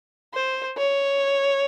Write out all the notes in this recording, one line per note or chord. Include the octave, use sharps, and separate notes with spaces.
C5
C#5